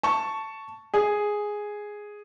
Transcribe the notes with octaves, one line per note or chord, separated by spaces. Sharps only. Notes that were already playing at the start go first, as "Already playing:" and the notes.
A5 C#6
G#4